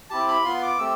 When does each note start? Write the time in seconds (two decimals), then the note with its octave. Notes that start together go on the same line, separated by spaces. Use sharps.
0.10 C4 E4 G4 A5
0.28 B5
0.44 B3 F4 C6
0.62 D6
0.79 A3 C4 G4 E6